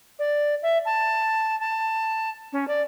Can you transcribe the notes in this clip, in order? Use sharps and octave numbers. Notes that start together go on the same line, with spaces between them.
D5
E5
A5
A5
C#4
D5